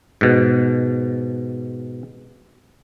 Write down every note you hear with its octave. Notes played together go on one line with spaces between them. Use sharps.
G#2 B2